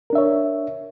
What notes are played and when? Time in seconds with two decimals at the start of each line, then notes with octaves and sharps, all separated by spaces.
0.10 A#4
0.13 D4
0.15 E5
0.18 C#5